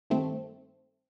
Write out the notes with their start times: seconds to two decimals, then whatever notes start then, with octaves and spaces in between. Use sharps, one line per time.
0.10 G2 D#3 A3 C4